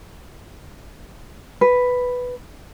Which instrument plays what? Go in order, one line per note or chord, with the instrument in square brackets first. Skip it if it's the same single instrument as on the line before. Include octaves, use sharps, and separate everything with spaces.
[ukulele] B4